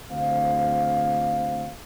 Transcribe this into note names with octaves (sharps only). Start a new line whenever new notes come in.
D2 C4 F5